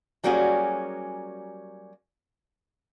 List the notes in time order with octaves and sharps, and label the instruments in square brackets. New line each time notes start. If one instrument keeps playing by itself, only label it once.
[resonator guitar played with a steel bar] F#3 G3 A#3 C#4 F#4 G#4